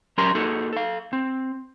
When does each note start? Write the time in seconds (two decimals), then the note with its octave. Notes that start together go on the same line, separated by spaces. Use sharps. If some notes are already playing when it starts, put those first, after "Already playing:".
0.18 F#3 C#4 G4 A#4 A#5 C6
0.35 A#3 D#4 F#4 G#4 A4
0.73 A4 F5
1.13 C4